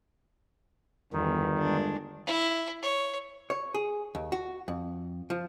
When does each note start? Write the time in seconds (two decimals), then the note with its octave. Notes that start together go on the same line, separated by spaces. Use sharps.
1.13 G1 E2 D#3
1.59 G#3 D4
2.27 E4
2.83 C#5
3.50 C#5
3.74 G#4
4.15 D#2
4.32 F#4
4.68 F2
5.30 F3